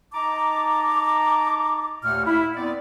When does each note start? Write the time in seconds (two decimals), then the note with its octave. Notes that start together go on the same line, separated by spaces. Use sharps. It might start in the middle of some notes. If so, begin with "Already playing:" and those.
0.13 D#4 A5 A#5 D6
2.04 D#2 A#2 A3 F#5 F6
2.26 E4
2.55 B3 C4 D5